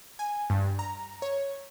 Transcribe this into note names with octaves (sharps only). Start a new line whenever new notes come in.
G#5
G2
A#5
C#5